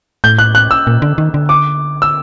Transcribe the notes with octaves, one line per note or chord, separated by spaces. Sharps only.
A2 G6
F#6
F#6
E6
A#2
D3
D#3
D3
D6
E6